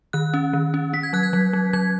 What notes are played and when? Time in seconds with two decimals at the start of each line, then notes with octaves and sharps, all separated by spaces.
0.13 D#3 F#6
0.34 C#4
0.53 D#3
0.74 C#4
0.93 C#4 B6
1.03 G#6
1.13 F#3 F#6
1.23 G#6
1.33 F#3
1.53 F#3
1.73 F#3 G#6